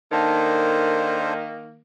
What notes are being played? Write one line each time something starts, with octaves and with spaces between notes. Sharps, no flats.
D#3 A#3 D4 A4 C5